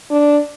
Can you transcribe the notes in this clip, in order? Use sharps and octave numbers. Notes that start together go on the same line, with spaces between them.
D4